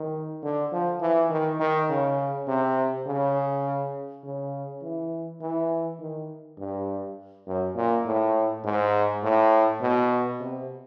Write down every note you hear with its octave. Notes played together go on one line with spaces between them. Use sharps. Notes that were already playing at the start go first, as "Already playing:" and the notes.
Already playing: D#3
D3
F3
E3
D#3
D#3
C#3
C3
C#3
C#3
E3
E3
D#3
G2
F#2
A#2
A2
G#2
A2
B2
C3